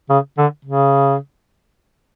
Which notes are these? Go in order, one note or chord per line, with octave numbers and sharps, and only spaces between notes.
C#3
D3
C#3